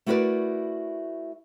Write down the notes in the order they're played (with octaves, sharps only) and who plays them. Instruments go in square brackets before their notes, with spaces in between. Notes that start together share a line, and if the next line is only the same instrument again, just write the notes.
[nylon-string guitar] A3 E4 F#4 A#4 B4 D5